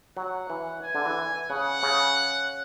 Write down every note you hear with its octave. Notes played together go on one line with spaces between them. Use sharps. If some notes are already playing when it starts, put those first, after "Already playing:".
F#3 F#5
E3
G#5
D3
E3
C#3 F#5
C#3